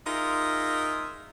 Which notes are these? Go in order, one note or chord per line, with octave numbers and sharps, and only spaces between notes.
D#4 F4 G#4 A#4 D#5 E5